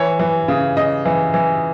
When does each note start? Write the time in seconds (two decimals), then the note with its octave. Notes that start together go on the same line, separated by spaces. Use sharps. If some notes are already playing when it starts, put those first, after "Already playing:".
Already playing: E3 C#5
0.20 E3
0.48 C#3
0.76 C#3 D#5
1.06 E3
1.34 E3